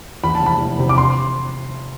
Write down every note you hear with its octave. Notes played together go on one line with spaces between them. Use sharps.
E2 B5
A5
F1 B5
E3
C3
D6
C6